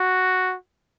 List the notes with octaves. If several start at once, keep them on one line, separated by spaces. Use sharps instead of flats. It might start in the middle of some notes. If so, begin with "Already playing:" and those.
Already playing: F#4